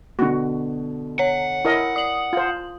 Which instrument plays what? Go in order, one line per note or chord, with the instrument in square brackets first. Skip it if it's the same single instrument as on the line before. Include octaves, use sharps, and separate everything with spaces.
[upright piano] B2 D3 [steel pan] F#4
[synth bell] C#5 [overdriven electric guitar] F#5
[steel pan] E4 A#4 D#5
[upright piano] D5 [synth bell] D#6 F#7
[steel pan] F4 C5